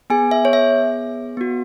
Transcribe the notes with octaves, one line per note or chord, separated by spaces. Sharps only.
B3 G#4 G#5
E5
C#5
E5
B3 F#4